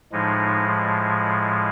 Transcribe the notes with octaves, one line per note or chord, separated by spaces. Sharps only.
A2 F3 G#3 D#4